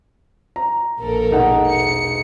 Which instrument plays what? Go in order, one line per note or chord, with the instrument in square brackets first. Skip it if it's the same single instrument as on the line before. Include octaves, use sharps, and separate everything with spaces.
[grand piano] A#5
[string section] A#1 A4 A#4
[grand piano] E1 D#4 F#5
[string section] C#7